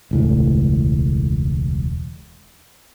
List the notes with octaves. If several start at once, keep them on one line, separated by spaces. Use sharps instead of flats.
E1 C#2 A2